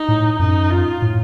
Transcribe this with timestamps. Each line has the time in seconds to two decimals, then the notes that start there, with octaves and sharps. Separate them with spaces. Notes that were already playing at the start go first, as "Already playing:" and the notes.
Already playing: D#4
0.08 A2
0.39 F#2 D#4
0.70 F4
1.02 A2